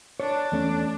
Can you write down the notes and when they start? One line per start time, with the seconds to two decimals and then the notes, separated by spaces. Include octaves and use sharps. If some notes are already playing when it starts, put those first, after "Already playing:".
0.20 D4 C#5
0.52 E2 A3 C#4